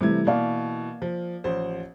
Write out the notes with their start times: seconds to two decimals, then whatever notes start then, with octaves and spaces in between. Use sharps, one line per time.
0.01 C3 E3 G3 A3 G#6
0.27 B2 E3 A#3 D5 F5
1.02 F3
1.44 A1 F3 C5